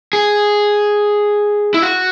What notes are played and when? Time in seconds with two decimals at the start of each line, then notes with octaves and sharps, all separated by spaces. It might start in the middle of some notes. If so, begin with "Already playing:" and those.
0.13 G#4
1.74 E4
1.82 F#4